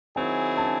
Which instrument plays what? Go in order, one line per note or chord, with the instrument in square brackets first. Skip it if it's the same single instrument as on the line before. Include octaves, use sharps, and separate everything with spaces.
[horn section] D#3 F#3 C4 E4 G#4 [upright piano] G#5
[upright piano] A5